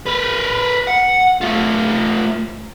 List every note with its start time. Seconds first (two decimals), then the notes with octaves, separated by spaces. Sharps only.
0.07 A#4 B4
0.87 F#5
1.41 A3 F4